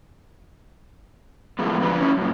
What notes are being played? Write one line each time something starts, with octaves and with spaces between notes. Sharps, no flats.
A2 E3 F3 G#3 A3 B3
F3 D4 B4
C#4 E4
F#2 A#2